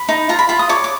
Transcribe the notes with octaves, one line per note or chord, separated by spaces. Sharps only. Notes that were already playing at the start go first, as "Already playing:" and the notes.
Already playing: B5
D#4
F4 A#5
B5
F4 B5
D#6
C#5 D6
D6